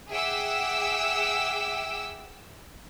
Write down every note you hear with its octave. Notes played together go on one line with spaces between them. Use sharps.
G#4 E5 F#5 G5 D6 E6